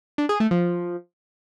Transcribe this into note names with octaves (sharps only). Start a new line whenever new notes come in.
D4
G#4
A3
F3